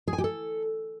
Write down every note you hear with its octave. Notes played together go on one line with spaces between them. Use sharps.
G#4
G#5
G4
A4